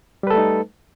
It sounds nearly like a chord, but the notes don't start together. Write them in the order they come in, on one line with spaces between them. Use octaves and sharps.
G3 B4 A4 A3 D#4